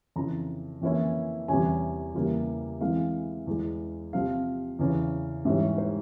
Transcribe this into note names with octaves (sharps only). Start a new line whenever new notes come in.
F2 C#3 E3 A#5
F2 E3 A#3 C#4 E4
E2 C3 E3 G3 C#4 G#5
E2 C#3 G3 A#3 E4
E3 G#3 C4 E4 F5
E2 E3 G#3
C3 F3 C4 F5
E2 C#3 E3
G#2 E3 G3 C#4 E5
C#5
C5